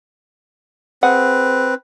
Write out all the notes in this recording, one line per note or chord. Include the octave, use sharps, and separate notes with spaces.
C4 G#4 B4 F#5